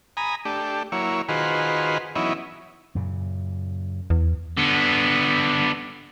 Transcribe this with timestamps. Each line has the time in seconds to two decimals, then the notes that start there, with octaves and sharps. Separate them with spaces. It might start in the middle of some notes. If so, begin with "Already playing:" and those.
0.17 G#5 A#5 B5 D#6
0.45 A3 D4 G4
0.92 F#3 A#3 E4 C#5
1.29 D#3 F4 F#4 G#4 B4 C5
2.15 E3 F#3 B3 C#4 D#4 E4
2.95 F#2 A#2 C#3
4.10 E2
4.57 D3 B3